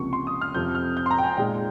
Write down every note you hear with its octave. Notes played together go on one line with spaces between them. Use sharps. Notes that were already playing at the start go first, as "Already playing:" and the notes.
Already playing: C#2 C3 F3 A#3 C#6
C6
D#6
F6
F2 C3 F3 G6
F6
G6
C6
A#5
G5
G#5
A#2 G#3 D#4 G5